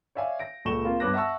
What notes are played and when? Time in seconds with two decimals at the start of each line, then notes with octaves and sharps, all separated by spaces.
0.15 C#5 D5 E5 F5 G#5
0.40 A#6 D7
0.65 C#2 A#2 A3 C#6 E7 G7
0.85 A#3 C4 F4
1.00 G2 B3 C#5 D6 F#6 A#6
1.14 E5 F#5 A5 C#6 E6